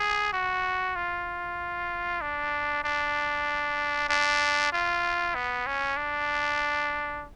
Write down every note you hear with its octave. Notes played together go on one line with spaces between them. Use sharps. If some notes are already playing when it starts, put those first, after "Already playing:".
Already playing: G#4
F#4
F4
D4
D4
D4
F4
B3
C#4
D4